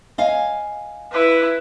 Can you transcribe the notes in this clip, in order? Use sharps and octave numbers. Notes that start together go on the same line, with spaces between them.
D#5 F5 G#5
E4 B4